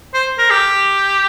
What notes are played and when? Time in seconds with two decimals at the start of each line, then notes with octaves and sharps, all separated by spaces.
0.14 C5
0.39 A#4
0.50 G4